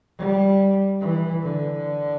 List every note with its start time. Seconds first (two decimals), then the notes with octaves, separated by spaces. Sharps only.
0.18 G3
1.01 E3
1.42 D3